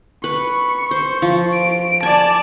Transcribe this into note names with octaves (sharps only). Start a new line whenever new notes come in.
B4 C#6
C5
F3
D7
D5 G#5 A5